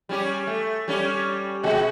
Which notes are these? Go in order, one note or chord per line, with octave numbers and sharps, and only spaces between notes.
G3 C#4 G4
A3
G3 C#4 G4
B2 G#3 F#4